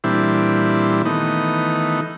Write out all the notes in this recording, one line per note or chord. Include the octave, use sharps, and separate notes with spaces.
A#2 E3 G3 C4 D4 E4
D#3 E3 A3 B3 D#4